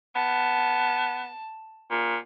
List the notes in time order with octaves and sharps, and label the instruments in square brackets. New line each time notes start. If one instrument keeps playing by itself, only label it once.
[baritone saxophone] B3 [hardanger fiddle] A5
[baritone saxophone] A#2